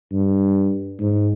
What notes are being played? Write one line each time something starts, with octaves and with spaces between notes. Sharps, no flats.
G2
G#2